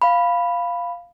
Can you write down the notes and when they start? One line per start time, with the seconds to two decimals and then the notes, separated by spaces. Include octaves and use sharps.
0.02 F5 B5